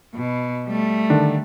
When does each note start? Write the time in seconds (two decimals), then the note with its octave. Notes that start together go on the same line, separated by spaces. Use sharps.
0.15 B2
0.67 G3 A3
1.10 D3 D#3 D4